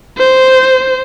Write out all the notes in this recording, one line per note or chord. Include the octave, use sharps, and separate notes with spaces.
C5